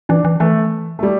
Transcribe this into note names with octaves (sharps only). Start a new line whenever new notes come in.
E3 D4
E3
E3 A3
A3
G3